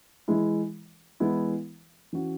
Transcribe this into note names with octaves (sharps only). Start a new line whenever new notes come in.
E3 G#3 E4
E3 G#3 B3 E4
E3 C#4 F#4